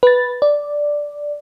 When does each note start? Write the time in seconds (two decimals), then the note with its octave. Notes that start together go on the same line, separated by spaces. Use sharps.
0.03 B4 A6
0.42 D5